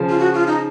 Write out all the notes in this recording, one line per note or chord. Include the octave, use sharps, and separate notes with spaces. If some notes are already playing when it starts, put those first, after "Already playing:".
Already playing: C#3 F3
F4
F#4
F4
D#4